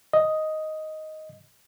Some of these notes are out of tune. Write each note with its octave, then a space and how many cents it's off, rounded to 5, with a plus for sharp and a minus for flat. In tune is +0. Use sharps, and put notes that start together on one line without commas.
D#5 +5